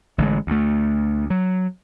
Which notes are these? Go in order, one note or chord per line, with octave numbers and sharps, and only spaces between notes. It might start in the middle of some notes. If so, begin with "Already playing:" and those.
A1 D3 F#3 G#3
D2 A3
F#3